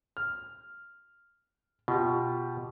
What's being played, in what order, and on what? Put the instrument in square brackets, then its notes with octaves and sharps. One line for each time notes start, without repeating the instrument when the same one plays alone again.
[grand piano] F6
[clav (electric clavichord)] B2 [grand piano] F4 G4